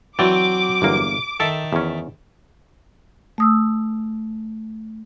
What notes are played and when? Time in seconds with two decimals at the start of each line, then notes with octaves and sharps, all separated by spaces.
0.19 E3 F#3 C4 D5 D6
0.82 G1 E2 A#3
1.40 D#3 A4 E5 A5
1.73 E2 C#4
3.38 A3 D#6 E6